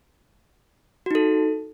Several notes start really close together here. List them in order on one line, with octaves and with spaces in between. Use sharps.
F#4 D#4 A4